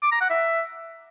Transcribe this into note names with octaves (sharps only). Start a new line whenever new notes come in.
D6
A#5
F#5
E5